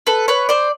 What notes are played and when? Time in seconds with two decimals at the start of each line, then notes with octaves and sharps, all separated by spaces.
0.07 A4 B4
0.28 B4 C#5
0.49 C5 D5